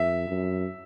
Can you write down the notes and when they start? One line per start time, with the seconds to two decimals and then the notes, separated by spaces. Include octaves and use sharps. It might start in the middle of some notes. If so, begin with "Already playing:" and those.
Already playing: F2 E5
0.28 F#2